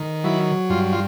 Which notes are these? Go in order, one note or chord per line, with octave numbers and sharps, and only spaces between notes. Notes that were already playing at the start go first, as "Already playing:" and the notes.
Already playing: D#3
F#3 E4
G2 F4
F4